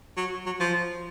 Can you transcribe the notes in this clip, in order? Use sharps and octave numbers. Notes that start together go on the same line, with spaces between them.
F#3
F#3
F3